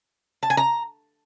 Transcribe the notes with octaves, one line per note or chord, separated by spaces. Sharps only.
A5
G#5
A#5